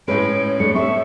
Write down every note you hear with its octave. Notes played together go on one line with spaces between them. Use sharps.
A2 G#3 C#4 B4 C#5 D7
A3 D4 C#7
C4 A4 E5 C#6